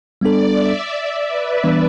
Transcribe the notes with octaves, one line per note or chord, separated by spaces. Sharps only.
G3 B3 D4 A4 D5
E5
D5
B4
E3 G3 B3 D4